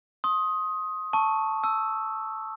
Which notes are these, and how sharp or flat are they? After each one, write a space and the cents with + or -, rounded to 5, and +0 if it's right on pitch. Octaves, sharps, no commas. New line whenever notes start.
C6 +35 D#6 +15
A5 +0 C#6 +0 E6 +0
A5 +0 E6 +0